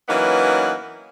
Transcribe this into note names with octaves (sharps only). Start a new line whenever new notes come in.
E3 F#3 A#3 B3 C#4 D#4